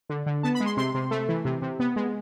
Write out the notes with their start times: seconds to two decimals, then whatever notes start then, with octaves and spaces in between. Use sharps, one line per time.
0.09 D3
0.26 D3
0.43 B3 A5
0.55 B5
0.60 G#3
0.66 C6
0.77 C3 C6
0.94 C3
1.11 A3
1.28 E3
1.45 C3
1.62 C3
1.80 B3
1.96 G#3